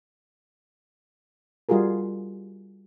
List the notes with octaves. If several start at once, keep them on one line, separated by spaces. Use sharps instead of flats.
G3 F4 F#4 G#4 A#4